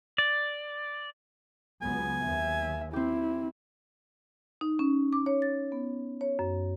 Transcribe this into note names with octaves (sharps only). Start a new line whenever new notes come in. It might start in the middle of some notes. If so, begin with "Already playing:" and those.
D5
C#2 F#3 B3 G#5
D#2 E5
C4 E4 G4
D#4
C#4
D6
C#5
A6
B3
C#5
F#2